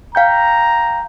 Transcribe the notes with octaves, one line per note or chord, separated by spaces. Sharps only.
F5 G5 A#5 G6